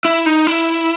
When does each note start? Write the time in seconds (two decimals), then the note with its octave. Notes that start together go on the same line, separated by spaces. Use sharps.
0.05 E4
0.26 D#4
0.47 E4